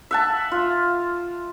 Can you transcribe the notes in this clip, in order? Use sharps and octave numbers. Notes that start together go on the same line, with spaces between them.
E5 F#5 A5
F4